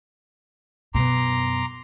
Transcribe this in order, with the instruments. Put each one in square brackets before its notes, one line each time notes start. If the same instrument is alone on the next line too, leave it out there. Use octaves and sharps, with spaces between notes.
[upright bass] F#2 B2 [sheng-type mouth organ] A#5 C6 D6